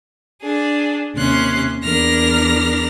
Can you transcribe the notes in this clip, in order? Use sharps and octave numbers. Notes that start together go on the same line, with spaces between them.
D4 G#4
D#2 C3 C#4 C6 F#6
E2 D4 A#4 F6 A#6